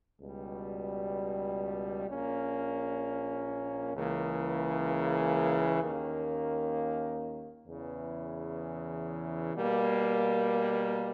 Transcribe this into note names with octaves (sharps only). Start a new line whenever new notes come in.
C#2 B2 G3
A#1 A#2 A#3 C#4
C#2 C#3 E3 A#3
D#2 D#3 A#3 C#4
E2 C#3 E3
B2 G3 A#3